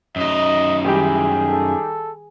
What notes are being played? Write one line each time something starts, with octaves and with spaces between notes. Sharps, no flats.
F#2 D#4 D#5
D#3 G3 E4 G4 G#4
A4